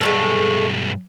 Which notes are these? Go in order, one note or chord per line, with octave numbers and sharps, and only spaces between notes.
B1 G2 G#3 A3 A4